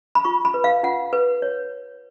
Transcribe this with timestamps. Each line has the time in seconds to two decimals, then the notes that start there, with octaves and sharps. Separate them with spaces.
0.15 B5
0.25 F4 C#6
0.45 B5
0.54 B4
0.64 F5
0.83 F4 F#5
1.13 B4
1.42 C#5